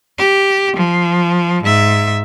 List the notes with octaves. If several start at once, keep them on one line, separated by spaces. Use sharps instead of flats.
G4
F3
G#2 E5